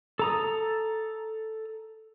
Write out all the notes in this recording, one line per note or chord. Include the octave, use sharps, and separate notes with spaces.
A4 A#5 D#6